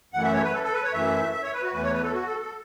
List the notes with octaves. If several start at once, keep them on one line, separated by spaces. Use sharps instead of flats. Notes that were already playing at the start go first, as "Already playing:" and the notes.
F#2 E3 A3 F#5
E5
C#5
B4
A4
A4
B4
C#5
F#2 E3 A3 E5
E5
C#5
B4
F#4
E2 E3 A3 B4
C#5
B4
A4
F#4
A4
A4